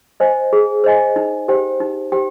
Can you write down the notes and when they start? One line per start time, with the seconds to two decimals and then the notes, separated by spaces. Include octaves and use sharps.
0.20 C5 D#5 G#5
0.53 G#4
0.84 C5 D#5 G#5
1.16 D#4
1.48 G4 C5 G5
1.80 D#4
2.12 G4 C5 G5